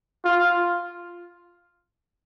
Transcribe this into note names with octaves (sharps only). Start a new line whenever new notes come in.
F4